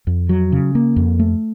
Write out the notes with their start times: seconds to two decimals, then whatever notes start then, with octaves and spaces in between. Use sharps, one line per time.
0.07 F2
0.29 F#3
0.52 C#3
0.75 A#3
0.96 F2
1.19 A3